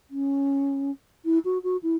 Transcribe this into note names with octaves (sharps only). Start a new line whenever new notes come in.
C#4
E4
F#4
F#4
E4